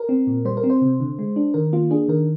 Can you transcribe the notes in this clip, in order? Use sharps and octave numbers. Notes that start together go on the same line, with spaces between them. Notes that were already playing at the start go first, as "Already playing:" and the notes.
Already playing: A#4
C4
A#2
G3 C5
A#4
C4
C5
C3
D3
G#3
D4
D#3 A#4
A#3 F4
D4 G#4
D#3 A#4